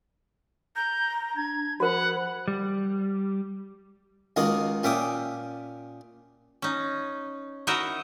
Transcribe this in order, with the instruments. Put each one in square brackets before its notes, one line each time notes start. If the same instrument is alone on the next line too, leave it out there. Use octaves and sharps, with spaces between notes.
[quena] A#5 [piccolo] G6
[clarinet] D4 [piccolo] G#6
[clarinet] F3 [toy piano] F#4 A#4 [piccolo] F#5 [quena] B5
[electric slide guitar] G3
[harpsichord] C#2 D#3 A#3 D#4 F#4 D#6
A#2 C#4 E5 G5 D6 D#6
[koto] C#4 D#4
D#4 E4 F#4 A#4 D#5 E5